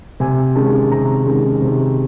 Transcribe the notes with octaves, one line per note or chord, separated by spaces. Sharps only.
C3 G#5
D#3 G#3 C#4 A5
C3 A#5
D#3 G#3 C#4
C3